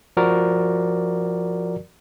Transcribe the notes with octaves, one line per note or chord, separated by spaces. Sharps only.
F3 F#4 A#4 D5